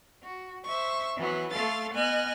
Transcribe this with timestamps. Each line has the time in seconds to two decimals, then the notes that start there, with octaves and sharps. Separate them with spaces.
0.23 F#4
0.64 C5 E5 C#6
1.16 E3 F#3 B3
1.50 A3 A4 F5 C6 A6
1.94 B3 D#5 G#5 F6 F#6